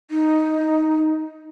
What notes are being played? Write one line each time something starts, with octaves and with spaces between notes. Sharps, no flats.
D#4